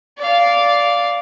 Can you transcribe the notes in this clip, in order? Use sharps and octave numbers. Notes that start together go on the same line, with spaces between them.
D5 F5